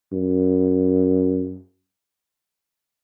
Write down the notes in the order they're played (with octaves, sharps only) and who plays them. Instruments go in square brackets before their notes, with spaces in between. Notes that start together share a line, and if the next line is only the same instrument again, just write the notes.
[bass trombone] F#2